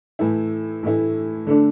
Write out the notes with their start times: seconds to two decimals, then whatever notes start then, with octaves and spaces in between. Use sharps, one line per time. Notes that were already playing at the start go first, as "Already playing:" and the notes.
0.19 A2 E3 A3 E4
0.83 A2 E3 A3 E4
1.47 D3 A3 D4